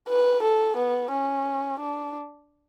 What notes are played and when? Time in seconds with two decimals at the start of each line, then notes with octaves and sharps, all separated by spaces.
0.09 B4
0.43 A4
0.77 B3
1.12 C#4
1.80 D4